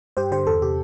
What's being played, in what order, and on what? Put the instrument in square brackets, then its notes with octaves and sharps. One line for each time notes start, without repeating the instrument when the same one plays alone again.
[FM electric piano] G2 G4 C5
D3 G4 C5
E2 A4
C3 G4